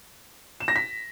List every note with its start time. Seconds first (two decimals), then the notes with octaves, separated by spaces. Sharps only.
0.60 E7
0.68 A#6
0.76 B6